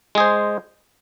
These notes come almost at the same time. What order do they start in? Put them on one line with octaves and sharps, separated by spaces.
G#3 G#4 C5